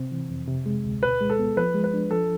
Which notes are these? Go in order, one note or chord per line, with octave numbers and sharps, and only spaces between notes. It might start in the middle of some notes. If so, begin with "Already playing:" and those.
Already playing: C3 C4
E3
F2
C3
G#3
D2
B2 B4
G#3
A4
B3
F3 B4
G#3
B4
D4
F3 A4